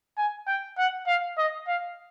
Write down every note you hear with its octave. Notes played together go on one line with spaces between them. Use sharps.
G#5
G5
F#5
F5
D#5
F5